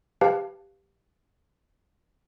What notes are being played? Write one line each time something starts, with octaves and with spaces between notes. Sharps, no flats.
G4 B4 F5 A5